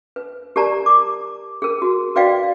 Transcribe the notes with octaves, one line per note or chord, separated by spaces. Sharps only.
B4
G4 A#4 D5 A5 A#5
D6
G#4 A#4
F#4
F#4 B4 D5 D#5 F5 G5